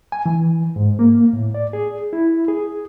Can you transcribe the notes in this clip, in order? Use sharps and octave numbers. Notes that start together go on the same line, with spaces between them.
G#5
E3
G#2
A#3
A2
D5
G#4
E4
G#4